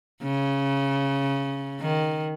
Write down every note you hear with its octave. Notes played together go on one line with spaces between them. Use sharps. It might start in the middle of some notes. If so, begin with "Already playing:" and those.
C#3
D#3